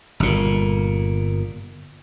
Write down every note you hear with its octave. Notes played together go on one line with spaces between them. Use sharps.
G1 A#2